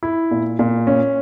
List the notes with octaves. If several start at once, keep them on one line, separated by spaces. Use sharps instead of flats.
E4
A#2
A#2
C#4